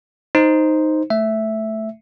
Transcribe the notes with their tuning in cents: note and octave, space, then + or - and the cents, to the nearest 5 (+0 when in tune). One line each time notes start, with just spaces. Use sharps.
D#4 +0 C5 +0
A3 +0 E5 +0